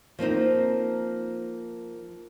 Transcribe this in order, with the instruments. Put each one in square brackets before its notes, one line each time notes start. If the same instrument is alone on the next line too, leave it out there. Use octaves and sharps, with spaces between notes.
[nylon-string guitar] F3 A#3 C4 D#4